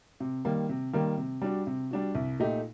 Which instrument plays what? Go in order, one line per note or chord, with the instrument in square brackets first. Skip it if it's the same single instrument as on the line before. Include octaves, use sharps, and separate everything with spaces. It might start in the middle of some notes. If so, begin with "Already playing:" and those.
[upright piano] C3
D#3 G3 A#3
C3
D#3 G3 A#3
C3
G3 D4 F#4
C3
G3 D4 F#4
C2
A#2 A3 D#4 G4